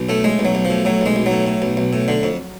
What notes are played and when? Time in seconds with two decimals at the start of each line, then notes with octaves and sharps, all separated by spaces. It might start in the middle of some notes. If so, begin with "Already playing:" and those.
Already playing: B1
0.09 A2 A3
0.24 A2 G#3
0.39 B1
0.45 F#3
0.55 B1
0.65 F3
0.70 A2
0.85 A2 F#3
1.01 B1 G#3
1.16 B1
1.26 F#3
1.31 A2
1.47 A2
1.62 B1
1.77 B1
1.93 A2
2.08 D3
2.23 F2